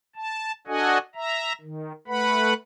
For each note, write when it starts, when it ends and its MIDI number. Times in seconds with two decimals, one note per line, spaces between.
0.16 0.52 81
0.67 0.98 62
0.67 0.98 66
0.67 0.98 69
0.67 0.98 75
0.67 0.98 78
0.67 0.98 80
1.15 1.53 76
1.15 1.53 82
1.61 1.92 51
2.08 2.54 57
2.08 2.54 71
2.08 2.54 78
2.08 2.54 83